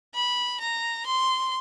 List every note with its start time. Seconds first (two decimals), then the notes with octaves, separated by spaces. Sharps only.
0.14 B5
0.60 A#5
1.06 C6